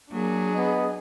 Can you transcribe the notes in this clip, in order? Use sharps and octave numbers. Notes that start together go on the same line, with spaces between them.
F#3 A#3 D4 G#4
B3 D#5